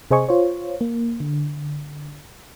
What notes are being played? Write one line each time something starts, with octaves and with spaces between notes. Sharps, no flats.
C3 G#4 C5 D#5 G#5 C#6
F4 C5 C#5
A#3
D3